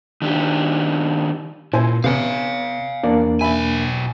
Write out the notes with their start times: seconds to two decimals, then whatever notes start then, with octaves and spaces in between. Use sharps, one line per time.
0.22 D#3 D4 G4
1.73 A#2 E4 C5 G#5
2.04 C3 B3 F5 G#5
3.03 E2 A#3 D4 D5
3.41 B1 E5 G#5 B5